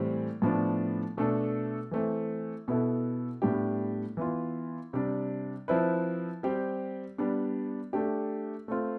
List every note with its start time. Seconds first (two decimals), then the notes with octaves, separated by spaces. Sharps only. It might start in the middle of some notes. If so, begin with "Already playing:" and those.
Already playing: A2 E3 G3 C4
0.42 A2 F3 B3 D4
1.17 B2 A3 D4 A4
1.91 E3 A3 C4
2.68 B2 B3 E4 A4
3.42 A2 G3 B3 D4 G4
4.17 E3 B3 F4
4.93 C3 G3 D4
5.68 F3 C4 E4 B4
6.43 G3 C4 G4
7.18 G3 B3 D4
7.93 A3 D4 G4
8.68 A3 C4 F4